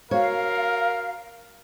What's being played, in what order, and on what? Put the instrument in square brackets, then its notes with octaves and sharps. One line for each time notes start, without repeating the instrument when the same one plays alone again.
[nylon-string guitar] F#4 C#5 [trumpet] A#4 [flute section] F5